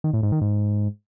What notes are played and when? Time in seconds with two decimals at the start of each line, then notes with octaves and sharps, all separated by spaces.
0.04 D#3
0.13 A2
0.23 G#2
0.32 D#3
0.41 G#2